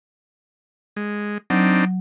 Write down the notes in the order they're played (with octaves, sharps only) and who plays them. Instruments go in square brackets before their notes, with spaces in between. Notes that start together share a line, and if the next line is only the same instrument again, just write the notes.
[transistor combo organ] G#3
[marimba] F#3 [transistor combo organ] C4 D4 D#4